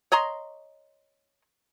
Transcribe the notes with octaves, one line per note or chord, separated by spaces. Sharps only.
C#5 D#5 A#5 C6